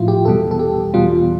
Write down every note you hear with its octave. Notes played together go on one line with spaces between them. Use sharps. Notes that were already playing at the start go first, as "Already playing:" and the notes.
Already playing: A2 F3 E4 F4
G4
E2 B2 G3 A4
A4
G4
E2 B2 G3 F4